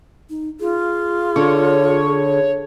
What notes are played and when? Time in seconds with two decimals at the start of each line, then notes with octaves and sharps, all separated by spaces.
0.30 D#4
0.60 F4 G#4
1.36 D3 C#5